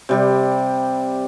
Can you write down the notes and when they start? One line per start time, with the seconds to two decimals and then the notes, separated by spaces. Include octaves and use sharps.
0.09 C3 G3 G4